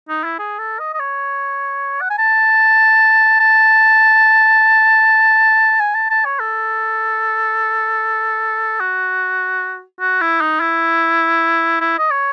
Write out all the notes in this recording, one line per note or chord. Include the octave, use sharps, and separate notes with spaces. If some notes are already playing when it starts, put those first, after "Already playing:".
D#4
E4
G#4
A4
D#5
D#5
C#5
F#5
G#5
A5
A5
G#5
A5
A5
C#5
A4
F#4
F#4
E4
D#4
E4
E4
D#5
C#5